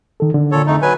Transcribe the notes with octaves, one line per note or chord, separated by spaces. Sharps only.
D#3 A4
D3
A#2 A4 C#5
F2 A3 D#4
F#3 B4 G#5